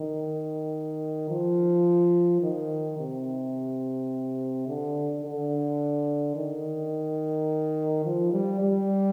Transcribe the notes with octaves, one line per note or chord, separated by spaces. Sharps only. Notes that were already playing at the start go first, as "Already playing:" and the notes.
Already playing: D#3
F3
D#3
C3
D3
D3
D#3
F3
G3
G3